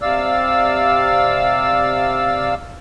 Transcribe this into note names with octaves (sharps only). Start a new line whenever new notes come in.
C3 D5 F5 E6